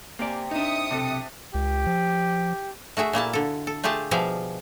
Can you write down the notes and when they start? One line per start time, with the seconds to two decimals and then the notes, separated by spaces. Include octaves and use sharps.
0.19 C3 A#3 G4 D5 G#5
0.51 D4 D#4 E5 D#6 C#7
0.90 B1 C3 D4 G4 A4
1.55 C#2 G4
1.87 F3
2.97 A3 F#4 G#4 E5
3.13 A#2 A#3 E4 A5
3.33 D3 A4
3.67 A4
3.84 A3 F4 G4 G#4 A5
4.11 B2 F3 G3 G#4 E5 F5